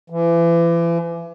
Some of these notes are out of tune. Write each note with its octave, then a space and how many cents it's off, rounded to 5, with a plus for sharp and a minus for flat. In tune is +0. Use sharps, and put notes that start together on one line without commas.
E3 +35